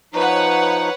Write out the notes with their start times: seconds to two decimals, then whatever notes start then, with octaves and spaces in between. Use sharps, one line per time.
0.14 F3 D#4 B4 C#5 F#5